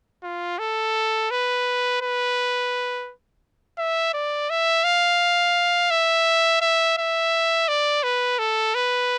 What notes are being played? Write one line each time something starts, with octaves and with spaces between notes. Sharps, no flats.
F4
A4
B4
B4
E5
D5
E5
F5
E5
E5
E5
D5
B4
A4
B4